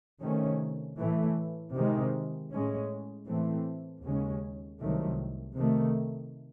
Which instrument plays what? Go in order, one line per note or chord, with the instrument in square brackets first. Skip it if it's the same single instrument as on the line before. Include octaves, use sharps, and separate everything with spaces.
[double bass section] C3 D#3 A3 C#4
A2 E3 A3
C3 D#3 G#3
A2 G#3 C#4
A2 E3 A3 C4
D#2 C#3 G#3 C#4
C2 C3 D#3 F#3 A3
C3 D#3 A3